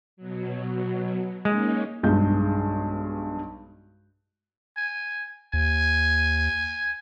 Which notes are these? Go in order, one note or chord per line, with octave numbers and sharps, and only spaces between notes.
B2 F#3
G#3 A#3 C#4 D#4
B1 G2 G#3 G6
G#5
D#2 G#5